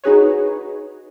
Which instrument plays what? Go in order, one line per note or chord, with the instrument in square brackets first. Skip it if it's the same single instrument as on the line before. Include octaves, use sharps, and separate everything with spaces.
[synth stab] D#4 F#4 G#4 B4 C#5